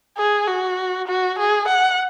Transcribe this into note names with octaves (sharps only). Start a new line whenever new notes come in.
G#4
F#4
F#4
G#4
F#5